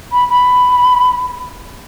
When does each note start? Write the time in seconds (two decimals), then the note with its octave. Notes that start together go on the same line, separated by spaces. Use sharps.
0.11 B5
0.29 B5